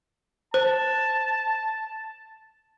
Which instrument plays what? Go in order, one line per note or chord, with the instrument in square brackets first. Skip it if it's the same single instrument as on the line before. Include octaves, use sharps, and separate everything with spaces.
[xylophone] C5 [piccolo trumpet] A5